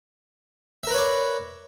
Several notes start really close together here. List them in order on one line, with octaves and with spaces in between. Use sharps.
E5 A#4 B4 C#5 D5